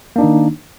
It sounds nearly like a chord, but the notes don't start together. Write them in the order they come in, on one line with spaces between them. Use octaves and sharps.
A#3 D4 D#4 D#3